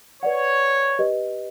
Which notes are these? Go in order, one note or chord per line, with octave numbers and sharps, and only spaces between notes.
B4 C#5 D5 F#5
G4 B4 D#5